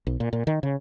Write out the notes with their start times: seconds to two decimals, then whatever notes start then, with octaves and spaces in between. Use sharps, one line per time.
0.07 B1
0.20 A#2
0.33 A#2
0.47 D#3
0.63 C#3